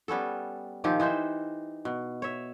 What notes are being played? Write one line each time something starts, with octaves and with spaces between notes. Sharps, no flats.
G3 B3 C#4 A4
A#2 D#3 F3 G4
E3 D#4 C5 E5
B2
C#5 E5